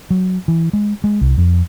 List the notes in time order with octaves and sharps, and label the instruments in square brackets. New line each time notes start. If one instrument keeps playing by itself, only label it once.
[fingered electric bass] F#3
E3
G#3
G#3
C2
F2